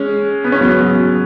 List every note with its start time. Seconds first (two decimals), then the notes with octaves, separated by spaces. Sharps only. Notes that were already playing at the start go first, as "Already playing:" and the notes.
Already playing: G#3 C#4
0.44 B3
0.52 C#4
0.61 F#3 B3
0.80 F#3